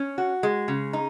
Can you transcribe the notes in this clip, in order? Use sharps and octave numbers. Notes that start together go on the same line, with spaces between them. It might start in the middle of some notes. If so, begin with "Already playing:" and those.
Already playing: C#4
F#4
G#3
C#3
D#4